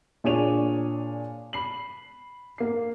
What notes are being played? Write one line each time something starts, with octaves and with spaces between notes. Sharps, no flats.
A#2 D4 G#4 C#5 D#7 F7
B5 C7 F#7
A#3 C7